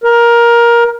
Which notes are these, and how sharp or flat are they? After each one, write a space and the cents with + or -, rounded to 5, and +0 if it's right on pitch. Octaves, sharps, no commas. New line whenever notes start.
A#4 +15